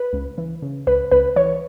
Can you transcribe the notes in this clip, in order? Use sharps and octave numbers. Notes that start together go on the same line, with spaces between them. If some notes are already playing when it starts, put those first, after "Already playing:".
Already playing: B4
C#2
E3
C#3
C#2 B4
C#2 B4
E3 C#5